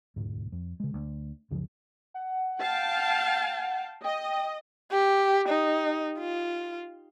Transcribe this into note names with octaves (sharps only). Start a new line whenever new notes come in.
E1 D2 G#2
F2
C#3 G#3
D2
C#2 F#2 C#3 F3
F#5
F5 G5 A5
D#5 G5
G4
D#4
F4